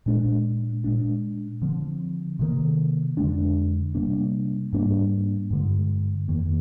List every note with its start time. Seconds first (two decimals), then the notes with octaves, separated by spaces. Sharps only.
0.06 A#2 G#3 D4
0.84 A#2 G#3 D4
1.62 D3 F3 C4
2.39 C3 D#3 A#3
3.17 F2 D3 G#3 D4
3.95 C3 G3 A#3 D4
4.73 G#2 G3 A#3 D4
5.51 G2 D3 G#3
6.28 F2 D#3 A#3